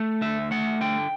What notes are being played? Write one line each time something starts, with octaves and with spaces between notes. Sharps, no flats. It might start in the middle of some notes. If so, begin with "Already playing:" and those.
Already playing: A3
D2 E5
A3 F#5
D3 G5